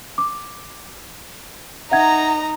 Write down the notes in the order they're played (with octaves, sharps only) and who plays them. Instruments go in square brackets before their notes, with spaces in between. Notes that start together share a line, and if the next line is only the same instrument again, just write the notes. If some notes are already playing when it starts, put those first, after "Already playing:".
[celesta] D6
[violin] D#4 A#5 [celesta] E5 F#5 G#6